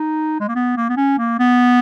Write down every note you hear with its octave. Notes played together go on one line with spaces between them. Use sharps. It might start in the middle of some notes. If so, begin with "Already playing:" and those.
Already playing: D#4
G#3
A#3
B3
A#3
B3
C#4
A#3
B3